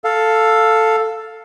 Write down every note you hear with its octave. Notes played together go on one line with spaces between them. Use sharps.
A4 F5